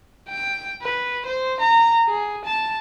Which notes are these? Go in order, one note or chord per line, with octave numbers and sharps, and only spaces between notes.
G5
B4
C5
A#5
G#4
A5